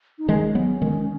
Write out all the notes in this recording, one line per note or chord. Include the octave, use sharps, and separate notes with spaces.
D#4
D#3 G#3 C#4
F#3 B3
D#3 G#3